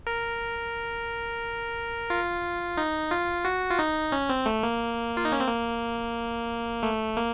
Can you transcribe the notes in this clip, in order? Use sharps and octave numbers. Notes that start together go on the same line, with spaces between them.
A#4
F4
D#4
F4
F#4
F4
D#4
C#4
C4
A3
A#3
F4
D#4
C#4
C4
A#3
A3
A#3